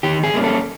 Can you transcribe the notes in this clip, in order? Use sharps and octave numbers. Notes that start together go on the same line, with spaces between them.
D#3 G4
G#4
G3 A#3 C#4
A4